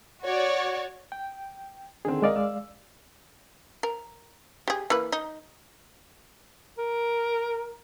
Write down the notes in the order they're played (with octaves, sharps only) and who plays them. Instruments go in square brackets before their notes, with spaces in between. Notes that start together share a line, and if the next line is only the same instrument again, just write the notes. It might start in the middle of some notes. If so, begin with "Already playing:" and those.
[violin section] F#4 C#5 D5
[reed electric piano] G5
[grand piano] D3 D#3 C4 [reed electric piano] G#4
[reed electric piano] G#3 D5 F5 [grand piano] A#4 D#5
[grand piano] E6
[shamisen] A#4
G4 G#4
E3 A#3 B4
D#4
[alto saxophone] A#4